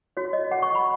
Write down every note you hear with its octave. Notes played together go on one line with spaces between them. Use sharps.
F#4 C#5
D#5
F#5
C#6
B5